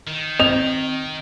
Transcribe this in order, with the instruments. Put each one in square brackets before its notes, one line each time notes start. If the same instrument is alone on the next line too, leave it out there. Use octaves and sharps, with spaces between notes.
[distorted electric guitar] D#3
[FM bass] C4 [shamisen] D#5 [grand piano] F7